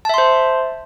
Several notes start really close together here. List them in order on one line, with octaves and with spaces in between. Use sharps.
A5 E5 C6 C5